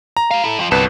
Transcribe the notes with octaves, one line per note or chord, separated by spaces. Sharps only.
A#5
G4 F5
E4 A4
F2 F3
G1 C2 F#3 A4 B4